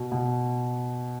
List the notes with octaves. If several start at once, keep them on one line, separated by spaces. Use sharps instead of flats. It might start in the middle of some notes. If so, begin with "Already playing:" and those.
Already playing: B2 F#4
B2